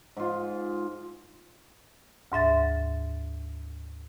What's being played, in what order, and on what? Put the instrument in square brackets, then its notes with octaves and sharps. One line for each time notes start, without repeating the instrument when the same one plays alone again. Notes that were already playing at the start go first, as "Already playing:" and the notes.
[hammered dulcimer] G#2 F4
[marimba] D2 G#2 E5 A6